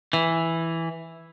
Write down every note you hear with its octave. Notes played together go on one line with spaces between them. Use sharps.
E3